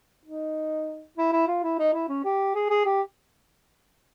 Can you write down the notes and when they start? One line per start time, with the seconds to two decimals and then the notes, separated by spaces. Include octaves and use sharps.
0.25 D#4
1.17 E4
1.33 E4
1.47 F4
1.63 E4
1.79 D#4
1.93 E4
2.09 C#4
2.25 G4
2.55 G#4
2.70 G#4
2.85 G4